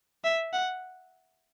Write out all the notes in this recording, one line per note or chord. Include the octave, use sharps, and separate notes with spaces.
E5
F#5